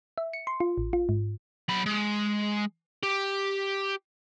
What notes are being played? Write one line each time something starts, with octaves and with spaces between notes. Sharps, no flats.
E5
C#7
C6
F4
A1
F4
G#2
F#3 B5
G#3
G4